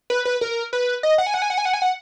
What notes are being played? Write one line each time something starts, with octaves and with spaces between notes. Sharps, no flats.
B4
B4
A#4
B4
D#5
F#5
G#5
F#5
G#5
F#5
G#5
F#5
G#5
F#5